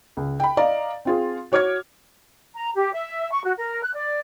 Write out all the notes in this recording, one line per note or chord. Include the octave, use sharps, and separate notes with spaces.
C#2
G5 B5
D5 D#5 F5 A#5
C4 F4 G#4
F#4 C#5 D6 F6 G#6
A#5
G4
E5
C#6
F#4
A#4
F#6
D5